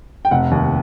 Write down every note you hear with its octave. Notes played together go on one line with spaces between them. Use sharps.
G5
F1 F#5
D#2